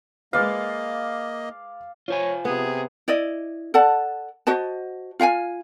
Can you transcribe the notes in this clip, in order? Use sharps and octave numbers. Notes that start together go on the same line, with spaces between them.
G#3 A#3 B4 D5 D#5 F5
F4 C5 C#5 G#5
C3 B3 G#4
E4 D5 D#5
A4 D5 F#5 A5
F#4 C5 D#5 A5
F4 F5 G5 G#5